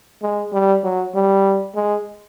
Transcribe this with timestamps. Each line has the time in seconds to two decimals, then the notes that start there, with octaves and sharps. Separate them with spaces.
0.22 G#3
0.52 G3
0.84 F#3
1.15 G3
1.75 G#3